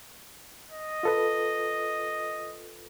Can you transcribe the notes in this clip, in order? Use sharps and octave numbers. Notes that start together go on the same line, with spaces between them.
D#5
F4 A4 B4